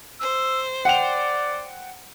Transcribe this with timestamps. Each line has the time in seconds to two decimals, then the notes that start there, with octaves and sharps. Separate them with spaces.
0.21 C5 E6
0.85 D5 F#5 G5 F7